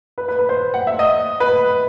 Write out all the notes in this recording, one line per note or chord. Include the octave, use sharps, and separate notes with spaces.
B4
B4
B4
C5
F#5
E5
D#5
B4